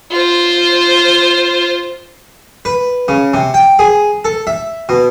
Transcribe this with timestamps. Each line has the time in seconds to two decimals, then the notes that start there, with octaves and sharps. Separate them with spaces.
0.12 F4 C5
2.65 B4
3.08 C#3
3.33 C3
3.54 G5
3.79 G#4
4.25 A4
4.47 E5
4.89 B2